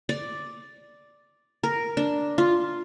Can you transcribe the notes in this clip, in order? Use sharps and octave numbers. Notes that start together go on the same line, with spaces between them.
D5
A#4
D4
F4